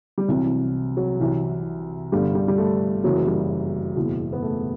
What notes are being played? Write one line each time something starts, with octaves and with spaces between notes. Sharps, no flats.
G3
C2 C3 E3 F#3
F#3
C2 C3 E3
G1 G2 D3 G3
G3
G3
A3
F#1 F#2 E3 F#3
G3
F#1 E2 B2
B3
A3